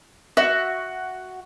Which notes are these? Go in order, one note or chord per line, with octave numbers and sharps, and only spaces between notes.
F#4 E5